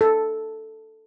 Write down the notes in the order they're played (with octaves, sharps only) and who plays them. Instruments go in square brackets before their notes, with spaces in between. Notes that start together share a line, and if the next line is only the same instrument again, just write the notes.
[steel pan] A4